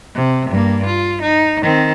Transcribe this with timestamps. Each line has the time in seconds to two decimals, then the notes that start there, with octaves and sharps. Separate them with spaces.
0.15 C3
0.50 G2 A#3
0.85 F4
1.22 D#4
1.62 D#3 C4